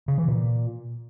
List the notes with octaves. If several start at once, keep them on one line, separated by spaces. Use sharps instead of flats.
C#3
E3
A#2